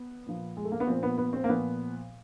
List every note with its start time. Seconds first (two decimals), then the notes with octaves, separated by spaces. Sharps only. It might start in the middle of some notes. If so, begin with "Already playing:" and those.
Already playing: B3
0.26 A#2 F3
0.57 G#3
0.65 A3
0.72 A#3
0.80 B3
0.87 A#2 F3 C4
1.03 B3
1.18 B3
1.33 C4
1.44 A#3
1.49 A#2 F3 B3